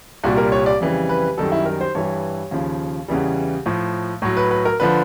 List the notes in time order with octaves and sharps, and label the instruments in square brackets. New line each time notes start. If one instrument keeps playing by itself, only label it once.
[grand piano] C2 A#2 G3 F#4
A#4
C#5
D5
F2 C#3 E3 G3
B4
F#2 D#3 G3 A4
E4
A#4
C5
G2 E3 G3 C#5
D#2 C#3 F3
E2 C#3 E3 G3
A2 F3
A2 F#3
B4
B4
A#4
D3 F3 B4